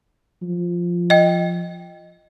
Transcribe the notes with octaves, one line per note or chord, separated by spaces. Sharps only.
F3
D#5 G5